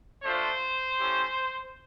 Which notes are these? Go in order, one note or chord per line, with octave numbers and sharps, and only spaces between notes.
A3 D4 F4 C5
A3 C#4 E4 G4